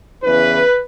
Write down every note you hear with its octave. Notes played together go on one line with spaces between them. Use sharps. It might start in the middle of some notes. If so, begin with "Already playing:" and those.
E2 C#3 E3 B4